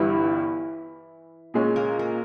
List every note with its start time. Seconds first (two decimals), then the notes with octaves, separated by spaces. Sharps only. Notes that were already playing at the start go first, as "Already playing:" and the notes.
Already playing: G1 G2 E3 G3 E4
1.54 A#2 G#3 C#4
1.76 A#3 A#4
1.99 A#3 A#4